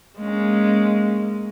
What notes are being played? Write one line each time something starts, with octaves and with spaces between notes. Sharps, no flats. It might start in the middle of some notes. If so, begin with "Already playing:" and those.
G#3 A#3 C#4